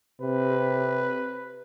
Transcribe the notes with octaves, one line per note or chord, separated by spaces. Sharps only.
C3 B4